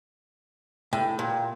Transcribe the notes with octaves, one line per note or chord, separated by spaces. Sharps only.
A2 G5
A#2